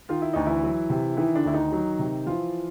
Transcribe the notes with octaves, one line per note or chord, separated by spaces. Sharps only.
D#3 F4
E4
D2 D#4
E3 E4
F#3
C3
D#3 E3 E4
D3 D4
D2 E4
D#3 D#4
F#3
C3
E3 F3 F4